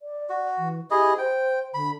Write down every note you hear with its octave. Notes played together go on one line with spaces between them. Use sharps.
D5
F#4
E3
E4 G4 G#4 D#5
C5 G5
D3 B5